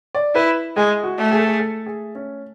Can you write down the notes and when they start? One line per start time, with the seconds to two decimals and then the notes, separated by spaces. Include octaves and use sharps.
0.15 D5
0.35 E4 B4
0.76 G#3 G#4
1.03 F#4
1.18 A3
1.32 G#4
1.39 A4
1.47 G#4
1.59 A4
1.86 G#4
2.15 C#4